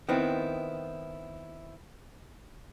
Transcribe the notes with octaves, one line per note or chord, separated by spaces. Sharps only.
D#3 B3 C4 E4